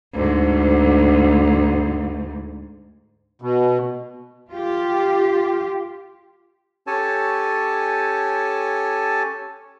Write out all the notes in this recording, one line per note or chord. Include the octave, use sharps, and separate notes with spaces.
D2 G#2
B2
F4 G4
C#4 G4 A4 C#5 G#5 A5